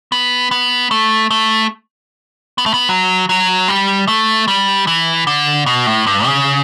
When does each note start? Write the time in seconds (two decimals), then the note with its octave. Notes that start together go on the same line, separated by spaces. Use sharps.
0.12 B3
0.51 B3
0.91 A3
1.31 A3
2.58 B3
2.66 A3
2.74 B3
2.89 F#3
3.29 F#3
3.68 G3
4.08 A3
4.48 G3
4.87 E3
5.27 D3
5.66 B2
5.86 A2
6.07 G2
6.26 C#3